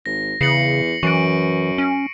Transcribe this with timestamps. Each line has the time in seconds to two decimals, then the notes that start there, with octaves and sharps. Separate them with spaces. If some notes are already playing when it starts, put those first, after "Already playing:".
0.06 G#1 A#6
0.41 E2 C#3 C7 C#7 F#7
1.03 F#2 E3 C#6 D7
1.78 C#4